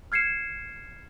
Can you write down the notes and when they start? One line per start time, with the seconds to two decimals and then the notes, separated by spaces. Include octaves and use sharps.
0.12 F6 G#6 C7 C#7 E7